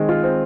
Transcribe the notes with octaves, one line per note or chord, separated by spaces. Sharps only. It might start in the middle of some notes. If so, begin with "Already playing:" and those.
Already playing: D#3 G#3 C4
F4
C4